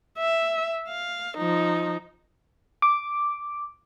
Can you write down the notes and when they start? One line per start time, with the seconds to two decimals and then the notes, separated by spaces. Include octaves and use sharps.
0.18 E5
0.89 F5
1.38 F3 D#4
2.82 D6